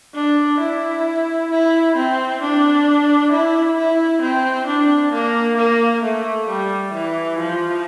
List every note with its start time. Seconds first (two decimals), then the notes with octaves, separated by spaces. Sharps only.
0.15 D4
0.60 E4
1.51 E4
1.96 C4
2.42 D4
3.32 E4
3.77 E4
4.22 C4
4.67 D4
5.12 A#3
5.57 A#3
6.03 A3
6.48 G3
6.94 E3
7.39 F3